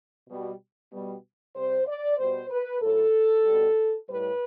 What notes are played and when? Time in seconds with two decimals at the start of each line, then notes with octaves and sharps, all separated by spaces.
0.29 B2 G3
0.92 B2 G3
1.55 C3 G3 C5
1.87 D5
2.17 B2 G3 C5
2.50 B4
2.81 A2 F#3 A4
3.44 B2 G3
4.07 A2 G3 B4